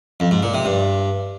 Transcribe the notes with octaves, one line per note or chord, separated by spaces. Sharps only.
F2
G#2
A#2
C3
G2